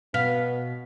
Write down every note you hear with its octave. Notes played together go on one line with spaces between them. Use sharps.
B2 B3 F5 B6